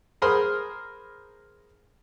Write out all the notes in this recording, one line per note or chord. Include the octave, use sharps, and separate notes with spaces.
G#4 A#4 C5 B5 C6